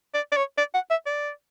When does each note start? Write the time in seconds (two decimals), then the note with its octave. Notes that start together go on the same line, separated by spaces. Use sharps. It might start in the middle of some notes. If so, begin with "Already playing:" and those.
0.14 D5
0.32 D5
0.37 C#5
0.58 D5
0.74 F#5
0.91 E5
1.06 D5